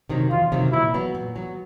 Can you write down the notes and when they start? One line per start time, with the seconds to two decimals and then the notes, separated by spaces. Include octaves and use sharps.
0.09 C3 D#3 F#3
0.31 E2 F4
0.52 C3 D#3 F#3
0.72 A#2 E4
0.94 F#3 B3
1.15 A#2
1.36 F#3 B3